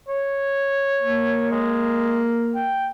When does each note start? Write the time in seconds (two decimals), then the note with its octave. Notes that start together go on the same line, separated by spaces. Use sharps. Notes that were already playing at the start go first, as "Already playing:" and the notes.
0.08 C#5
1.02 A#3
1.51 G#3
2.55 G5